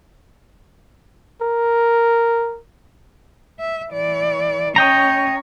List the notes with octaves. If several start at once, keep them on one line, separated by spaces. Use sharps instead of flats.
A#4
E5
E3 D5
C#4 C#5 D#5 G5 A#5